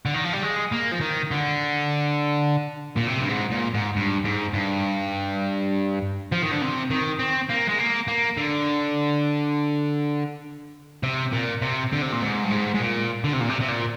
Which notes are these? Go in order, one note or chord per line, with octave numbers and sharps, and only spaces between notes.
D3
D#3
F3
G3
G#3
A#3
F3
D#3
D3
A#2
C3
G2
G#2
A#2
G#2
G2
G#2
G2
F3
D#3
D3
C3
D#3
C4
A#3
G#3
A#3
A#3
D3
C3
A#2
C3
D3
C3
A#2
G#2
G2
G#2
G#2
A#2
D3
C3
A#2
C3
C3
A#2